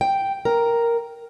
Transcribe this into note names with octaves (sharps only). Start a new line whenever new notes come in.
G5
A#4